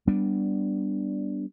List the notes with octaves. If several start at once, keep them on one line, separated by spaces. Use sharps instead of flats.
G3 B3 D4